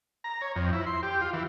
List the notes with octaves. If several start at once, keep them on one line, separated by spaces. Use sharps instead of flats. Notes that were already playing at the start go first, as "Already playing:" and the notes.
A#5
C#5
F2
E4
C6
G4
F4
E3